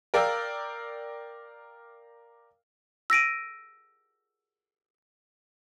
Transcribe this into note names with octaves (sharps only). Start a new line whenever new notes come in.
A#4 D5 F5 G5 E6
E6 A#6 D7 D#7